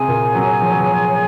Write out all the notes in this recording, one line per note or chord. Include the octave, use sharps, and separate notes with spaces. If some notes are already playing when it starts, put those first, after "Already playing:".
Already playing: C3 C4 G#4 C#5 G#5
A#2 A#3
F#2 F#3
F3
F#3
F3